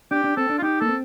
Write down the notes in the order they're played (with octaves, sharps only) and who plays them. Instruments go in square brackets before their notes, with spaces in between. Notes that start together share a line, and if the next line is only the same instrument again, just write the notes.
[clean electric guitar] D4 [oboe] G4
[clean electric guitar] D4
[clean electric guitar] C4 [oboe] A4
[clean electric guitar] D4
[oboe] F4
[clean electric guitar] D#4 [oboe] G4
[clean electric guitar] A#3 [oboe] A4
[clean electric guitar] C4